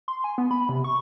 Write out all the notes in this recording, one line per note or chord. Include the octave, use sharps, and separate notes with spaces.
C6
G#5
B3
B5
C3
C#6